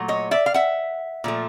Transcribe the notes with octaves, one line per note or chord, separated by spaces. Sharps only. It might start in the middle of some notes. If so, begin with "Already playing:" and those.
Already playing: A#2 F#3 A3
C#5 D#5
D5 E5
F5
E5 F#5
A#2 F3 A3